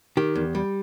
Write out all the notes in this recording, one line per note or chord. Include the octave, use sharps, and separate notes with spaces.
D#3 G4
E2
G3